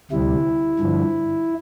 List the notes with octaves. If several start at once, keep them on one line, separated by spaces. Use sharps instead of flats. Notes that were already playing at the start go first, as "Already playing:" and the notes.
D2 C3 G3 E4
G2 D3 F3